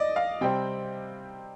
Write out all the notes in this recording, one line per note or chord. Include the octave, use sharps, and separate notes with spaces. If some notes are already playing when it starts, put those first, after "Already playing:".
Already playing: D5 D#5
F5
C3 G3 C4 G5